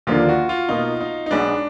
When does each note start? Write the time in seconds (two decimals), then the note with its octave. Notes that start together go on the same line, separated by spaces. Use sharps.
0.07 D#2 D3 F3 A#3 D4 F4
0.29 F#4
0.49 F4
0.69 B2 A#3 D#4 F4
1.01 D#4
1.26 D#4
1.31 B1 B2 G#3 B3 D4